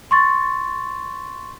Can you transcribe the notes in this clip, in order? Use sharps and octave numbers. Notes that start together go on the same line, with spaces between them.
C6 C#6 A6